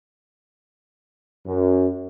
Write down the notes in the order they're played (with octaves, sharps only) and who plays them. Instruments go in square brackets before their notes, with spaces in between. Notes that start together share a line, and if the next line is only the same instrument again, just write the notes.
[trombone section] F#2